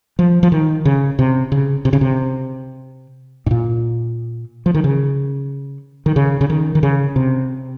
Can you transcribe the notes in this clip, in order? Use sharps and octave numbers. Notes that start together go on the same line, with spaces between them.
F3
F3
D#3
C#3
C3
C#3
C3
C#3
C3
G#2
A#2
F3
D#3
C#3
D#3
C#3
C#3
D#3
D#3
C#3
C3